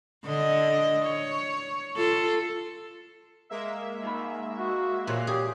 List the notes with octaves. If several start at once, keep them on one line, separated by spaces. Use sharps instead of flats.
D3 D#5
C#5
F4 A4
G#3 A#3 E5
G#2 B5
F#4
A#2 F#4 C#5 F5
G4 G#4